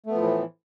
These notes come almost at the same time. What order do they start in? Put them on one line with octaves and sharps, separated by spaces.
A3 B3 F3 A2 E3